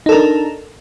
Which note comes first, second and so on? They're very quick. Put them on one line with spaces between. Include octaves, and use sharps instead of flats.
D#4 A4 A#4 D4